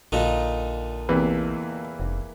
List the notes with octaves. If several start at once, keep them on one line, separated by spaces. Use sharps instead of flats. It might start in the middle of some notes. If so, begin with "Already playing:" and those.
A#1 A#2 D3 D#4
E2 C3 E3 A#3 B4
F1